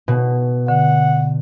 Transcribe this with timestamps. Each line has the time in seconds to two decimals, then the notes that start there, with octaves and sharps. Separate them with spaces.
0.08 B2
0.68 D3 F#5